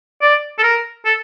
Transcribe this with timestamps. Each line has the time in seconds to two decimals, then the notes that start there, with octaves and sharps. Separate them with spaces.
0.22 D5
0.58 A4
0.63 A#4
1.05 A4